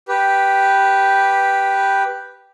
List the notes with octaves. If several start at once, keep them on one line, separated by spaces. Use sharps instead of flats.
G4 B4